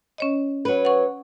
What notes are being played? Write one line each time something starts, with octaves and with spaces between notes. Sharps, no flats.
C#4 C#5 D#5
F#3 B4
F#5 C#6